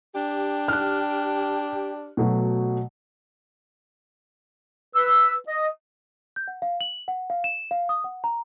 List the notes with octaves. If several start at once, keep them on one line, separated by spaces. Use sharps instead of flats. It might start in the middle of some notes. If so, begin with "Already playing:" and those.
D4 G4
F6 F#6
B2 F#3 A3
B4 E6
D#5
G6
F#5
F5
F#7
F#5
F5
E7
F5
D#6
F#5
A#5